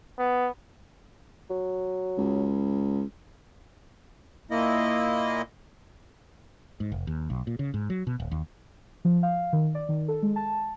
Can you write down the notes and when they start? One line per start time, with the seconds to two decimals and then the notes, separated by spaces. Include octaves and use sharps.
0.18 B3
1.50 F#3
2.18 C#2
4.51 A#2 A#3 E4 D#5
6.80 G#2
6.92 F1
7.07 D#2
7.30 B1
7.47 A#2
7.59 C#3
7.74 G#2
7.90 F#3
8.07 B2
8.20 D1
8.31 D#2
9.05 F3
9.23 F5
9.53 D#3
9.75 D5
9.89 D#3
10.08 A4
10.23 G#3
10.36 A5